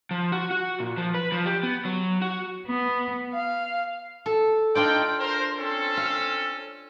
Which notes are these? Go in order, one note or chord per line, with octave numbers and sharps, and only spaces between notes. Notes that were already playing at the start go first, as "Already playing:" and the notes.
F3
F#4
F#4
A#2
F3
B4
F3
G4
B3
F#3
F#4
B3
F5
A4
D4 D#4 F4 D5 G5
A#4 C5
C4 C#4 A4
F5